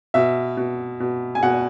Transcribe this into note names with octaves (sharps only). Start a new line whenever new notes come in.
B2 E5
B2
B2
G#5
B2 F#5